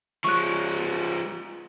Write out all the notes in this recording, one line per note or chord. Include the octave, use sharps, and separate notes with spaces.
F3 G#3 C#6 F#6